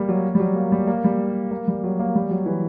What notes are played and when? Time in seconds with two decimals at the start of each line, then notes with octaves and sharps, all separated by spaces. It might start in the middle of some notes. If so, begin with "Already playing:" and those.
Already playing: G3 A#3
0.09 F#3
0.35 G3
0.40 F#3
0.55 A#3
0.72 G3
0.87 A#3
1.04 G3
1.51 A#3
1.68 G3
1.84 F#3
1.99 A#3
2.15 G3
2.31 F#3
2.46 E3